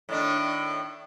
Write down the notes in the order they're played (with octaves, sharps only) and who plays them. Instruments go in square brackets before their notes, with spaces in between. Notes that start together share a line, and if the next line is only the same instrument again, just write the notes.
[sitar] A2 D#3 D4